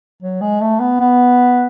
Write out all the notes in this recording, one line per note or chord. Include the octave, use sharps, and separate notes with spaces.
F#3
G#3
A3
B3
B3